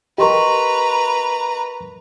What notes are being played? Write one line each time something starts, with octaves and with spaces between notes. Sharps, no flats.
G4 A#4 B4 D#5 A#5 C6 C#6